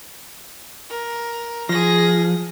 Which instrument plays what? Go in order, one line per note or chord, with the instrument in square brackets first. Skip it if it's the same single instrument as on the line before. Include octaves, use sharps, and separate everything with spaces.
[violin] A#4
[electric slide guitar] F3 [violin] G#4 A#6